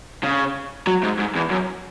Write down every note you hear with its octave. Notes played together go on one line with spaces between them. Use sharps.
C#3
F#3
G#2
G#2
E2
F#2